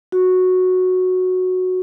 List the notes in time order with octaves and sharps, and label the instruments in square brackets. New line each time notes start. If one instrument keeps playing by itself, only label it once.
[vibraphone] F#4